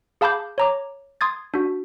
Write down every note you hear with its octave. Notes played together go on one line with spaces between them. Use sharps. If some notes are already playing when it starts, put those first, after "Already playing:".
G#4 F5 A5 B5 D6 G6
C#5 A#5 D6
C6 D#6 G#6 A6
D4 F#4